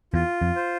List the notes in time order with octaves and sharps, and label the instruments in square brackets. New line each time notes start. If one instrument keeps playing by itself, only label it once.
[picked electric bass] E2 [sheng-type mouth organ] F4
[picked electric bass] F2
[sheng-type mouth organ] C5